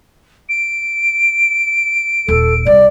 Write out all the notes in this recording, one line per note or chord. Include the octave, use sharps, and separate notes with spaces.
D7
D#1 A4
C2 D5